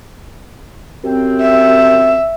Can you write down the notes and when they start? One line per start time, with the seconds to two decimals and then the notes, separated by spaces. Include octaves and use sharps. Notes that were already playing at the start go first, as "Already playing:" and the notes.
1.04 F#2 C3 C4
1.41 E5